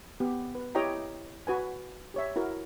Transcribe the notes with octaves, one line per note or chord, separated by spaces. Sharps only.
B3 G4
B4
E4 G4 C#5 D#5 G5 A#5
F#4 B4 G#5
G4 C#5 E5
E4 F#4 A#4